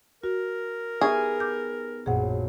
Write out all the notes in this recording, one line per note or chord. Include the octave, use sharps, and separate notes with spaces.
F#4 A#4
B3 D#4 G4 G#4 E5 C#6 F6
D6 G6
A#1 F#2 G#4 F#5